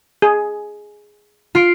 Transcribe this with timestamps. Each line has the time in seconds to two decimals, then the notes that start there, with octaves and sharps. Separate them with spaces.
0.22 G#4
1.55 F4 C7 D7